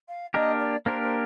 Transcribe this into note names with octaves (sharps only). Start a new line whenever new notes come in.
F5
A#3 D4 G4 A#4 D#5
D5
A#3 D4 G4 A#4 C5
C5